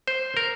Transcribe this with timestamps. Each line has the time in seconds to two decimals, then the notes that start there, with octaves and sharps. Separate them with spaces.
0.07 C5
0.37 A#4